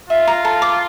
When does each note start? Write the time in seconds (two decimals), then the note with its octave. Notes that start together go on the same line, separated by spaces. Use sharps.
0.09 F4 E5
0.27 A#5
0.45 A4
0.62 D6